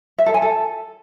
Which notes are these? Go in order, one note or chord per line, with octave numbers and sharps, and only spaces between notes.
E5
A4
G#5
A4